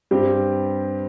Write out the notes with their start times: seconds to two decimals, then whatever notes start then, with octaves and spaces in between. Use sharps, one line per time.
0.11 G2 G3 C4 G4